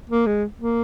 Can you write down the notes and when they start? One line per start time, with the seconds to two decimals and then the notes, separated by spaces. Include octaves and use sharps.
0.10 A#3
0.27 G#3
0.59 A#3